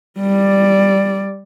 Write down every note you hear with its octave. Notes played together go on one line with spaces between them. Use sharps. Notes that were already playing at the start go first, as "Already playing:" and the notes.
G3 D5